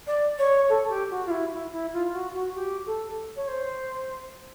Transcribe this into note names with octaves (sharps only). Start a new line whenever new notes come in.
D5
C#5
A4
G4
F#4
F4
E4
E4
E4
F4
F#4
F#4
G4
A4
C#5
C5